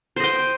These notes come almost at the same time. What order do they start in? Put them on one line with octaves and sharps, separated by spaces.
C5 D#5 G5